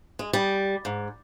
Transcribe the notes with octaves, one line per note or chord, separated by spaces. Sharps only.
G#3
G3
G#2